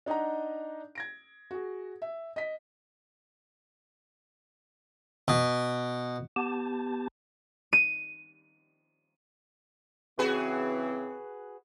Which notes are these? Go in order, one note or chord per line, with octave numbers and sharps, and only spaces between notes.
D4 D#4 D#5 F#5 A#5
G#6 A#6 D7
F#4 G#4
E5
D#5 B6
B2
B3 G4 A5
D#7
C#3 E3 C4 F#4 G#4 B4